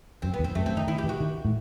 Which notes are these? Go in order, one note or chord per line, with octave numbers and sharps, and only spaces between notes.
F#2 C4
B3
E2
C4
F#2 A3
F#2 C4
D#3 D#4
D#3 E4
G4
E3
F#4
D#3
A2